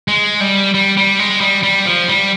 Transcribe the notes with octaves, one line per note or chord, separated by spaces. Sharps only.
G#3
G3
G3
G3
G#3
G3
G3
F3
G3